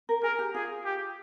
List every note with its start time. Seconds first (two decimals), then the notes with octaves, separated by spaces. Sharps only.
0.09 A#4
0.23 G#4 A#4
0.39 G4
0.54 F4 G#4
0.85 G4